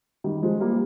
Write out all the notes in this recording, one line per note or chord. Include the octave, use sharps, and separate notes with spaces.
D#3 G3
F3 G#3
G3 A#3